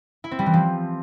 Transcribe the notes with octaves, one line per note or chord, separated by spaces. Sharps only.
E4
C4
G3
E3
F3